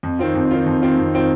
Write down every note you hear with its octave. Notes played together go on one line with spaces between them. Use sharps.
F2
D#3 C4 F4
F2
D#3 C4 F4
F2
D#3 C4 F4
F2
D#3 C4 F4